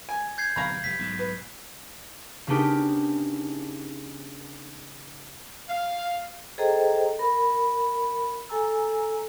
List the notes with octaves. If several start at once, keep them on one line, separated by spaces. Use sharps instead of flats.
G#5
G6 G#6 C7
D1 B1 C3 F5 A#5 B5
F1 G3 B6
B1 G#2 B2
B4
C#3 B3 D4 D#4 G4 A#4
F5
G#4 A4 C5 D#5 G5 A#5
A#4 B5
A4 G#5 A#5 E6